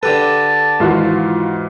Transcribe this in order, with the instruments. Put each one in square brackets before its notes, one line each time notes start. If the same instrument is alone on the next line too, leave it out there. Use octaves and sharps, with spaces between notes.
[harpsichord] D3 G4 B4 [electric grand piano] A4 [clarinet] A5
[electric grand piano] G#2 E3 [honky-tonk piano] D#3 F4 F#4